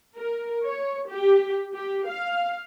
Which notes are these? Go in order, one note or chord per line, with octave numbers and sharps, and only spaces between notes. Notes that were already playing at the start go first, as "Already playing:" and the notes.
A#4
C#5
G4
G4
F5